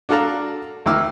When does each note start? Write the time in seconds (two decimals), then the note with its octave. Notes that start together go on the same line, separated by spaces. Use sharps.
0.09 D4 F#4 A4 F5 A5 A#5
0.86 D2 D#3 E4 D6 E6 F6